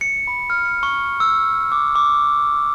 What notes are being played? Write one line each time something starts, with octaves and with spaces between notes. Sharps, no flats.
C#7
B5
F6
C#7
C#6
E6
D6
D6